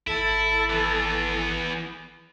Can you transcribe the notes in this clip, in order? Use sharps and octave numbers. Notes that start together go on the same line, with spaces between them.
G#1 E4 A4
E3 B3